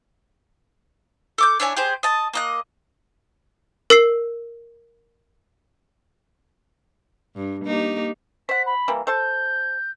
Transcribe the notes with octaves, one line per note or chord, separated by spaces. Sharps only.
A4 D6 G6
D4 E4 C#5 G#5
G4 G#4 C5
D#5 A5
A#3 D#5 F#6
A#4 E6 C7
G2
A#3 D#4 G4
C5 F#5 B6
B5
E3 G3 A#3
A4 C5 A5 G6